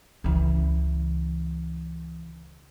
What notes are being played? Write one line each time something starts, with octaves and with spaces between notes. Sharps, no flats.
C#2 E3